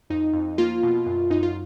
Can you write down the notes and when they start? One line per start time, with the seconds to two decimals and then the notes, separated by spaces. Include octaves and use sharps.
0.10 F2 D#4
0.34 F2
0.58 A#3 F4
0.83 B2
1.06 F#2
1.30 F#2 D#4
1.43 F4